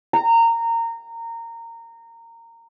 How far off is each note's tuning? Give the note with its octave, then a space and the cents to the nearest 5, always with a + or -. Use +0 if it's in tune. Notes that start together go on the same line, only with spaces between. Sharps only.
A#5 -20